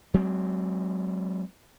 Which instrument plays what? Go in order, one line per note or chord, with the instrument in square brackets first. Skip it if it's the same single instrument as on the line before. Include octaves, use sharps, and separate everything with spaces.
[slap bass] F#3 G#3 C4